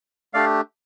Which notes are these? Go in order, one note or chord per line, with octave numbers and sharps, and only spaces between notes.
A3 D4 G4 D5 F5